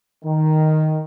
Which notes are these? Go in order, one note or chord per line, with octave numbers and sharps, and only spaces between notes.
D#3